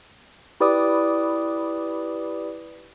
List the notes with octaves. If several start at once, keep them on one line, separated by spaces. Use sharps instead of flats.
E4 G4 B4 D5 D6 D#6